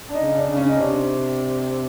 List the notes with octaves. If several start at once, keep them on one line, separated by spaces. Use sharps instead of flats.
D4
D#4
C#3
D4
C#3
C#4
D#4
C3 D4